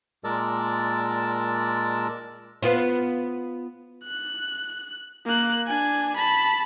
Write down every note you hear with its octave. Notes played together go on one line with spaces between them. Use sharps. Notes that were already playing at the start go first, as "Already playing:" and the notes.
A#2 G#3 A#4 D5 A5 E6
B3 F4 C5
F#6
A#3 F#6
D4 G#5
A5 B5